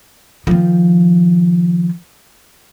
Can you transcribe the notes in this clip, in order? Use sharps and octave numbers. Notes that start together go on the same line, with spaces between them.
D#3 F3